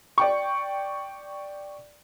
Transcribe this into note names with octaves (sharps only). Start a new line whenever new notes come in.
D5 G5 C#6